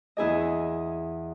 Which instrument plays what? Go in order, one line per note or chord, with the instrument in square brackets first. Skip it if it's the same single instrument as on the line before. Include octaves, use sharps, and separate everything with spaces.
[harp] E2 E4 G#4 D#5